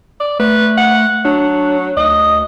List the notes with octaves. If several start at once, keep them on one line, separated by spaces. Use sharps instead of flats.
D5
A3 B4
F#5
F#3 D4
D2 D#5